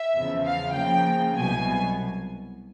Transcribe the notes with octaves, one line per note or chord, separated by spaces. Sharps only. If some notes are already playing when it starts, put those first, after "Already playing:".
Already playing: E5
E2 C#3 F3
F5
C#3 F3 A#3 G5
C2 B2 F#3 G#5